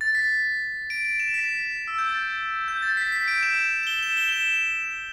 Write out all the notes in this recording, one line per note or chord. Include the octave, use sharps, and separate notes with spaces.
A6
B6
D7
D7
E7
B6
E6
G6
A6
G6
A6
B6
B6
D7
E7
E7
G7
E7
G7
E7